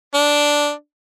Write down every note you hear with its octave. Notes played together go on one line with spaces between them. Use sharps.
D4